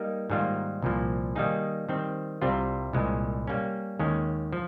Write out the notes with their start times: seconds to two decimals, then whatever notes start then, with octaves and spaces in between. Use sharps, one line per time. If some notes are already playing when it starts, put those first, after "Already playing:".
Already playing: G3 A#3 D#4 A#4 D#5
0.30 G#2 D#3 G3 A#3 F4
0.82 C2 A#2 F3 A#3
1.36 D#3 G3 A#3 D#4 G#4
1.89 D#3 G3 C4
2.42 C2 C3 G3 C4 F4
2.93 C2 A#2 G#3
3.47 G3 A#3 C#4
3.99 D#2 D#3 G#3 C#4
4.53 F3